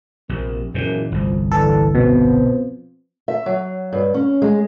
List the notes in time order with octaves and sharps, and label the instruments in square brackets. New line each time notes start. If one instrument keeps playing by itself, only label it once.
[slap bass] A#1 [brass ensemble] C3 A#3
[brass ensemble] F#1 [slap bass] E2 A#2
[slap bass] G1 C2 [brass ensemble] F3
[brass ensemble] D3 E3 [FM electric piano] A4
[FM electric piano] B2 [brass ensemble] F3 B3 C4
[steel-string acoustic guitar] E5
F#3
G2
C#4
G#3